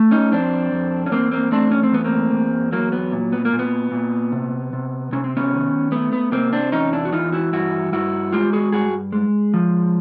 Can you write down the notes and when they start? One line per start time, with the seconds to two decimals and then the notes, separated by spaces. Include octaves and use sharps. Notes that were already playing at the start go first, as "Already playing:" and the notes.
Already playing: A3
0.11 C#4 D#4
0.32 F2 C4 D4
0.72 F2
1.06 C#4
1.12 E2 A#3 C4
1.32 A#3 C4
1.52 A3 C4 D4
1.72 C#4
1.83 C4
1.92 E2 B3
2.04 A#3 C4
2.32 E2
2.72 F#3 A#3
2.92 B3
3.12 A#2
3.32 B3
3.45 A#3
3.53 A#2
3.59 B3
3.92 A#2
4.32 C3
4.73 C3
5.12 C3 C#4
5.24 C4
5.37 B3 C#4
5.52 D#3
5.92 A3 B3
6.13 B3
6.32 C3 A#3 C4
6.53 C4 D4
6.72 E2 C#4 D#4
6.92 D4 E4
7.05 F#4
7.13 E3 D#4 F4
7.32 E4 F#4
7.52 G2 E4 F#4
7.92 G2 E4 F#4
8.33 G#3 F4 G4
8.53 F#4 G#4
8.72 G2 F#4 G#4
9.12 G#3
9.54 F3